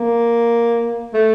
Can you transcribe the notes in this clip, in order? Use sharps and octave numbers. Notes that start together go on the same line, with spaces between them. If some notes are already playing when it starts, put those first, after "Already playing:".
Already playing: A#3
A3